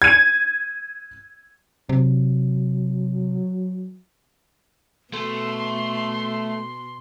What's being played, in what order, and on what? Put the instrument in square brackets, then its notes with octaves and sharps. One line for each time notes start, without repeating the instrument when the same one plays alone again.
[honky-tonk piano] G#6 D#7
[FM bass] C3 [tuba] F#3
[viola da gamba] B2 [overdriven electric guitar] A3 [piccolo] C6